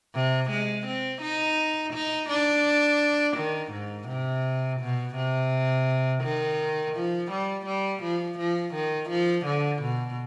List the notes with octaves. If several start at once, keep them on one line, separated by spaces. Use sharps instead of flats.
C3
G#3
C4
D#4
D#4
D4
D#3
G#2
C3
B2
C3
D#3
F3
G3
G3
F3
F3
D#3
F3
D3
B2